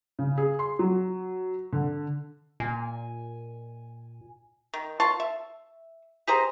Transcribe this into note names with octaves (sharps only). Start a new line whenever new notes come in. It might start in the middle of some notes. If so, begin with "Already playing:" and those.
C#3
G#4
C6
F#3
D3
A#2 G#5
D#3
F4 C#5 A5 C6
E5
G4 G#4 C5 A#5